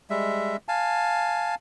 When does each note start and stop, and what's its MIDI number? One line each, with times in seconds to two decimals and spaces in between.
0.10 0.56 55
0.10 0.56 56
0.10 0.56 76
0.68 1.55 77
0.68 1.55 80
0.68 1.55 81